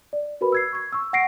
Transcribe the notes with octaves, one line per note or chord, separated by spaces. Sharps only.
D5
F#4 A#4 B4 B5
E6 G#6 C7
C#6 G#6
C#6 E6
F#5 A#6 C7 D7